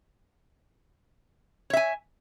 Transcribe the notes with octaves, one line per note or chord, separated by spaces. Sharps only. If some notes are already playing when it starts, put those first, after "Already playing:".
C#5 E5 G#5